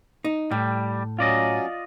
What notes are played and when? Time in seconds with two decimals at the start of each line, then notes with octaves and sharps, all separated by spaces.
0.25 D#4
0.51 A2 G3
1.19 F#3 C#4 F4 D5 D#5